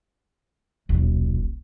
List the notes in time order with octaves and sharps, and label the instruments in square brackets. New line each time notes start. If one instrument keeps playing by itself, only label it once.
[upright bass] D#1 B1